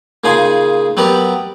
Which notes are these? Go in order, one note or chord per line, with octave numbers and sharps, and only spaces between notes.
A#2 C#3 D#4 G#4 G#5 C6
F#3 B3 G4 A#4 D5